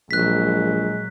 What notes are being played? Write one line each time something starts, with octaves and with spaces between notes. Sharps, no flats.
A#1 A#2 F#3 G#3 F#6 B6